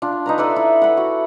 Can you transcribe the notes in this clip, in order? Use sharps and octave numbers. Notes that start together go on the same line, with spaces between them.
D4 F4
D#4 B4 A#5
A4 B4 D5 E5
E4
F#5 B5
F#4